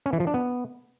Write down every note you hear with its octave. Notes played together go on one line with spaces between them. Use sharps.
C#4
E3
F3
D4
B3